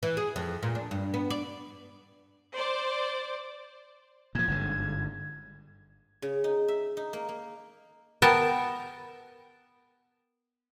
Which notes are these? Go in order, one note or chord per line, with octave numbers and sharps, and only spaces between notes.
E3
G#4
F2
A#2
D4
G2
B3
D5
C5 D5
A#2 F3 G#6
G1 G#2 D3
C#3
D#4
E5
D#4
A#3
A#3
B3 A#4 G5 A5